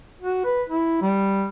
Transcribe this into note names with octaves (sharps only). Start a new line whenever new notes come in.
F#4
B4
E4
G3